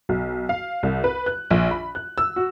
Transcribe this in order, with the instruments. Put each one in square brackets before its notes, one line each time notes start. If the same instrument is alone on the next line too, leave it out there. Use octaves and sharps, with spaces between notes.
[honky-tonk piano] B1
F5
C2
B4
F#6
A#1
B5
F#6
E6
F#4